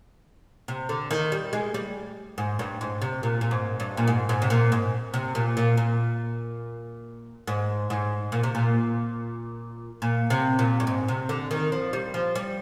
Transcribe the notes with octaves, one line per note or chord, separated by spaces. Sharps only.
C3
D3
D#3
G3
G#3
G3
G#2
G2
G#2
C3
A#2
A#2
G#2
G2
A#2
G#2
G#2
C3
A#2
G#2
C3
A#2
A#2
A#2
G#2
G#2
A#2
C3
A#2
A#2
C3
A#2
G2
G#2
C3
D3
D#3
F3
G3
F3
G3